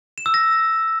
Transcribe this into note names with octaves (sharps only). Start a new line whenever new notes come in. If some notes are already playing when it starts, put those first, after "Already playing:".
E7
E6
A#6